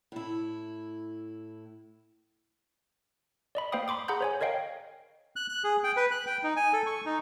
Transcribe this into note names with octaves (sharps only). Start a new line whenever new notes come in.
A2 E4
D5 D#5 B5
A#3 C5 F5 G5 B5 D#6
B5 C6 D6 D#6
G#4 F#5 A#5 B5 G6
C5 C#5 G#5
A#4 C#5 D#5 F5 G5
F#6
F#6
G#4
G5
B4
F#6
G5
D#4
G#5
A4
C#6
D#4